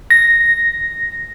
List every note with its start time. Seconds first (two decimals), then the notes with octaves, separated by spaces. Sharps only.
0.10 A#6